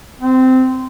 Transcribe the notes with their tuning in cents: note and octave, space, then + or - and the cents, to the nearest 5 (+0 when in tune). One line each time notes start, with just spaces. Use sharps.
C4 -15